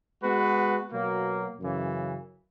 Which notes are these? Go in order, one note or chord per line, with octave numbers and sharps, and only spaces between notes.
G#3 B3 F#4 B4
B2 F#3 A#3
F#2 C#3 E3